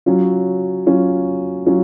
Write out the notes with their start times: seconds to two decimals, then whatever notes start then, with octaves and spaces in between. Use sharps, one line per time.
0.06 F#3 C#4 F4
0.87 F#3 C#4 F4
1.66 F#3 C#4 F4